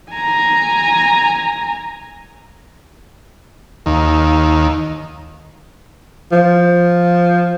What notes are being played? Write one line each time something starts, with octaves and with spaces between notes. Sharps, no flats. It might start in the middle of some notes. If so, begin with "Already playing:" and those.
G#5 A#5
D#2
F3